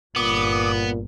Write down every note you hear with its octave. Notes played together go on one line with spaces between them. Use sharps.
G1 A#2 B3 D6 D#6